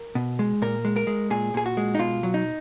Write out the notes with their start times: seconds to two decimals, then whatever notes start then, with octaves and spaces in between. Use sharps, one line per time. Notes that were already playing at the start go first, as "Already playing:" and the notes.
Already playing: A#4
0.15 B2
0.39 G#3
0.62 A#2 A#4
0.85 G#3
0.96 A#4
1.07 G#3
1.30 A#2 G#4
1.54 A#2 G#4
1.66 F#4
1.77 G#3
1.95 D#4
1.99 B2 F4
2.23 F#3
2.34 D#4